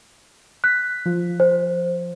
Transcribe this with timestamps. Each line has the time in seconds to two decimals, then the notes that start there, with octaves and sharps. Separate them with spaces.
0.64 F#6 B6
1.06 F3
1.40 C5